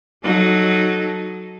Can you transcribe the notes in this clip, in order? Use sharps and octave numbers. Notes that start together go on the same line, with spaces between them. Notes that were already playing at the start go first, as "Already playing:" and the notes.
F#3 D#4 A4